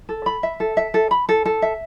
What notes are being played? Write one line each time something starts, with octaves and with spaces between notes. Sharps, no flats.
A4
B5
E5
A4
E5
A4
B5
A4
A4
E5